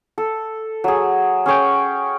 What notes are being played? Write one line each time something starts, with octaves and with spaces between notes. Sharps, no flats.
A4
F#3 G#4
C#4 G#4 C#5 G5